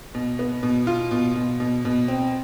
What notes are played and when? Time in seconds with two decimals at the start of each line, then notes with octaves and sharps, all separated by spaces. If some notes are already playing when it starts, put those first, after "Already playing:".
0.15 B2
0.39 B3
0.63 B2
0.87 F4
1.11 B2
1.36 B2
1.60 B2
1.85 B2
2.08 C4